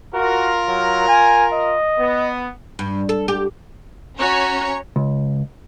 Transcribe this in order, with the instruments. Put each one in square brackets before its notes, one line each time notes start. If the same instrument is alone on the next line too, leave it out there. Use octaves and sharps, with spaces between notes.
[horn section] F4 A#4 [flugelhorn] F#4
[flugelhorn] F#3
G#5
D#5
[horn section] B3
[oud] G2
A4
G4
[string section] C#4 C#5 [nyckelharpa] F#4 [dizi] A#5
[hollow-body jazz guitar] C#2